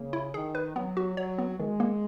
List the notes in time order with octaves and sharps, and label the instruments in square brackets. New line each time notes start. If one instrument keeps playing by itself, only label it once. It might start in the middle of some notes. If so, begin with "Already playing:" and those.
Already playing: [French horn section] C#3 [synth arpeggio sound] A#3
[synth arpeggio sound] E4
[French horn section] D#3 [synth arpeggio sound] G#4
[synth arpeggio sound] B4
[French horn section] F#3 [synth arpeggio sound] B3
[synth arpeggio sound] F#4
[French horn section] F#3 [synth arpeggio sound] C#5
[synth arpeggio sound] B3
[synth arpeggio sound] D#3 [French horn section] G#3
[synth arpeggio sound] A#3